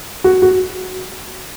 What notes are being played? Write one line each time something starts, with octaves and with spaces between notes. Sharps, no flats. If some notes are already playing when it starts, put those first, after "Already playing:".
F#4
F#4